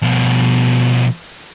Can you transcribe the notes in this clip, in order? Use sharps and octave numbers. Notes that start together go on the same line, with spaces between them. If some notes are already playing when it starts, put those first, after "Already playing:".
B2 F3